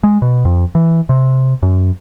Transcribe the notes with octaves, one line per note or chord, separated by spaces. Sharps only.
G#3
B2
F2
E3
C3
F#2